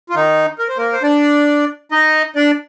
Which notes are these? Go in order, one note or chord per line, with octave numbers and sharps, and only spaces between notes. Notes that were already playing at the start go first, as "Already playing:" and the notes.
F4
D#3 D#4
A#4
C5
A#3 A#4
C5
D4 D5
D#4 D#5
D4 D5